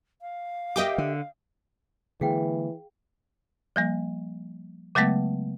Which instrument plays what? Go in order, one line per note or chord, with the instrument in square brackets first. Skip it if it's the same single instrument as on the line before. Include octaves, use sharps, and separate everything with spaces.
[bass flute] F5
[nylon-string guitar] G4 A#4 E5 [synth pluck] D#5 G5 D6
[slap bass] D3
[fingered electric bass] D3 G#3 A#3 [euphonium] E3 [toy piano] G#4 F5 G5
[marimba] F3 G3 A#3
C#3 F#3 G#3 A3 B3